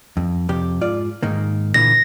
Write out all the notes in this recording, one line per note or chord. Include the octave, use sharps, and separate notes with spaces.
F2
F2 C3 G4
G#2 F4 D5
G#2 D#3 A#3
A#2 D3 E3 A#6